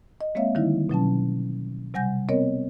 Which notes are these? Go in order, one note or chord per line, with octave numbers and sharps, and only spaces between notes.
D#5
G#3 A#3 C4 C#5 E5 F5
D3 D#3 F#3 G3 D#4 E4
B2 F#3 C#4 A5
C3 G3 F#5 G#5 G6 A#6
B3 C4 A#4 C#5 D#5